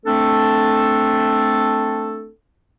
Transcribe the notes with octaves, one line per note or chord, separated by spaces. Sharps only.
A3 C4 D4 A4